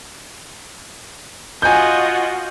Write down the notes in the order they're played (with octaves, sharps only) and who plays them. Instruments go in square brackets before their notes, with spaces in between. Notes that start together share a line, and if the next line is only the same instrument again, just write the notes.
[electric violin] F4 F#4 [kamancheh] D#5 F#5 [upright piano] G#5 G6